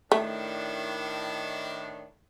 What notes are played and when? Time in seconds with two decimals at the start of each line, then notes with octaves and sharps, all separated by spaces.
0.12 A2 D#3 A3 D4